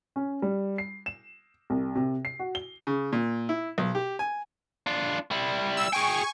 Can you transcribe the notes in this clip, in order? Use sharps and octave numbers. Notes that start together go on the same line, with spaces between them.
C#4
G3
C7
E7
C2
C3
C7
F#4
G7
C#3
A#2
E4
B1
G4
G#5
D4 F4
G3 E4
E6
G#4 G5 G#5 C#6